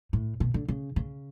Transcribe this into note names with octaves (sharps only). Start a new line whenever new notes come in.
A2
B2
D3
C#3
C#3